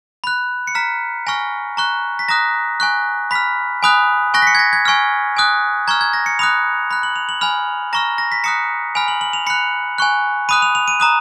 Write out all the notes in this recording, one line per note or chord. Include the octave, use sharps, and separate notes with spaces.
B5 F#6
C#7
A#5 F6 B6
G#5 C#6 F6 A#6
A#5 C#6 F#6
B6
A#5 D#6 F#6 A#6
G#5 C#6 F#6
B5 F6 B6
G#5 B5 D#6 F#6
G#5 C#6 F#6 A#6
B6
C#7
G#6
A#6
G#6
G#5 C#6 F6
G#5 D#6 F#6
A#5 C#6 F6 G#6
G#6
A#6
C#7
B5 D#6 F#6 F7
B5 F#6
F#7
F7
F#7
G#5 B5 F6 F7
A#5 C#6 F6 A#6
A#6
B6
A#5 D#6 F#6 C#7
G#5 B5 F6 F7
F#7
F#7
F7
B5 F#6 C#7
G#5 C#6 F#6
B5 D#6 F#6 D#7
F7
F7
D#7
A#5 D#6 F#6